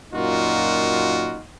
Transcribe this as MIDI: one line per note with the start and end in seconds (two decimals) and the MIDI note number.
0.13 1.42 42
0.13 1.42 46
0.13 1.42 63
0.13 1.42 65
0.13 1.42 66